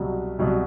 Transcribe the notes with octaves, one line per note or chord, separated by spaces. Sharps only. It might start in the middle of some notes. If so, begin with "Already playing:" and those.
Already playing: C2 B2 F#3
C2 B2 F#3